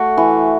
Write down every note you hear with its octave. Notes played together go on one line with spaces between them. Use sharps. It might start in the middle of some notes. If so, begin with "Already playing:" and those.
Already playing: A3 F#4
E3